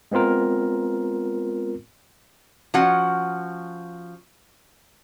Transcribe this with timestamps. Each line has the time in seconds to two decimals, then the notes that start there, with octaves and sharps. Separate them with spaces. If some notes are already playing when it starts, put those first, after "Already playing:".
0.12 G#3 B3 C4 F4 A#4
2.74 F3 C#4 F#4 F#5